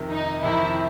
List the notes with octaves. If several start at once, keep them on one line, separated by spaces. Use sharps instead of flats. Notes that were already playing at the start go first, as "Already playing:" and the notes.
Already playing: F2 C3 D#3
D#4
F2 C3 D#3 E4